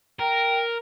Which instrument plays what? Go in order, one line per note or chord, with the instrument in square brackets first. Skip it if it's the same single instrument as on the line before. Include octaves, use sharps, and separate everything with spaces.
[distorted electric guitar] A#4 [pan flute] G5